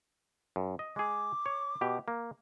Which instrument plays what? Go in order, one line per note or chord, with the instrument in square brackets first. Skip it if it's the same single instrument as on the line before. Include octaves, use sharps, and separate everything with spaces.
[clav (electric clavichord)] F#2
D#5
[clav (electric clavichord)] G#3 G#4 [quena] D6
[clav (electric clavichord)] C#5
B2 G4
A#3